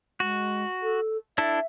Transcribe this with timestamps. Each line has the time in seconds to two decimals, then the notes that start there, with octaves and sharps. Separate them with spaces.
0.20 G#3 F#4
0.82 A4
1.38 D4 E4 A4 E5